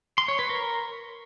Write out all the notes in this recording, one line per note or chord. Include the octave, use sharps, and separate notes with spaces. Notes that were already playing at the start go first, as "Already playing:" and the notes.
C6
C#5
B4
A#4